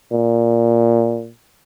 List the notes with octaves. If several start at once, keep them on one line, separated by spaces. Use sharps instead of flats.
A#2